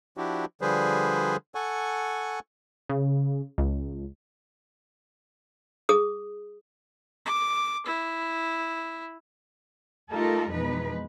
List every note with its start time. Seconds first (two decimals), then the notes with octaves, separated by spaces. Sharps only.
0.17 F3 D4 E4 F#4 G4
0.61 D3 F3 G3 G#4 B4 C5
1.55 A4 F#5 G#5 C#6
2.89 C#3
3.58 C#2
5.89 G#4 D#6
7.26 D6
7.86 E4
10.11 A3 D#4 F4 G4 A4 A#4
10.49 F2 B2 E3 G#3 D#4 B4